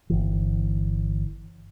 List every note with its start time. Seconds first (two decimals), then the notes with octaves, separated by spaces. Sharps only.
0.10 G1 E3